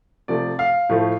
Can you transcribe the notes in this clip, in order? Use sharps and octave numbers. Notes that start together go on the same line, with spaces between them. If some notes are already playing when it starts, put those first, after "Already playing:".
C3 F3 A3 D5
F5
A2 F3 A3